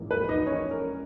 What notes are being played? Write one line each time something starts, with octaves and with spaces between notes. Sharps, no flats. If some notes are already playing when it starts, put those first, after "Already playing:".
Already playing: A#1 G#2 E3 A#3 C#4
B4
D#4 D#5
C#4 C#5
A#4